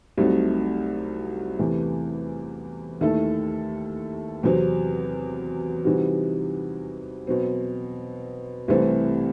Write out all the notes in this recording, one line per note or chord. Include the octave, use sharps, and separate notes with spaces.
C2 C3 F#3 A3 D#4
E2 C3 E3 A3
D#2 D#3 A3 E4 A4
E2 C3 F#3 C4
C3 E3 G3 D#4 F#4
B2 F#3 C4
C2 C3 E3 A3 C4